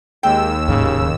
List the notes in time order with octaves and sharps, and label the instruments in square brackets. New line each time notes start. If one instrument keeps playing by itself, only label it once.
[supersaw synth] D#2 E6 [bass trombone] G#3 [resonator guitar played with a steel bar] G5
[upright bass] D1 G#2 [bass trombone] C#3